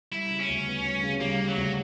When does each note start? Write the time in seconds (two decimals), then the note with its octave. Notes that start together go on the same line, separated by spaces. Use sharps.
0.12 G3 E4
0.30 C#3
0.39 C#4
0.49 D2
0.67 B3
0.84 G3
1.03 C#3
1.20 G3 A#3
1.40 C#3
1.48 F#3
1.57 D2